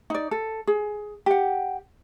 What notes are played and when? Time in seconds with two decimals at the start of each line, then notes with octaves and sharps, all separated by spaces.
0.10 D#4 D5
0.31 A4
0.67 G#4
1.26 G4 F#5